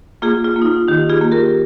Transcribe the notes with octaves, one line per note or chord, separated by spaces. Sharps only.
A#3 F4 G#4
F4
A#3
D#4
F4
D#3 D#4 G4
F4 G#4
A#3
G4 A#4